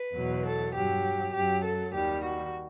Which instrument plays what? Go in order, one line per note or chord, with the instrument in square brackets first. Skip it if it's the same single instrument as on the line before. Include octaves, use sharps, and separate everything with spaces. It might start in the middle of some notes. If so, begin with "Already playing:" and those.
Already playing: [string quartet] B4
E2 B2 F#3
A4
G2 F#3 G4
F#2 F#3 G4
A4
D#2 D#3 G3 G4
F#4